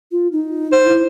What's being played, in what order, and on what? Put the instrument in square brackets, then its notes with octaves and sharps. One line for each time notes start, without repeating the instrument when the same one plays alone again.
[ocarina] F4
D#4
[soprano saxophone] C5
[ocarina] E4